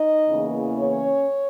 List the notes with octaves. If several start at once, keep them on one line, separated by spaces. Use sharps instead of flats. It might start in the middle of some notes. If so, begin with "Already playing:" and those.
Already playing: D#4 D#5
E2 C#3 E3 A#3
C#4 C#5